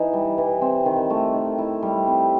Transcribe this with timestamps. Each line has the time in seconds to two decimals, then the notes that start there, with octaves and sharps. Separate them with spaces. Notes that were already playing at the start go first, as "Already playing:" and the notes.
Already playing: E3 D#4
0.13 G3
0.38 E3
0.61 C4
0.86 D#3
1.10 A3
1.34 D#3
1.58 E4
1.83 G3
2.07 C4